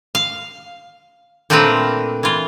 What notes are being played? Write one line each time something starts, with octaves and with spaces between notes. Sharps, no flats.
F5
A#2 A3 C4 D4 A#4 B4
E3 F4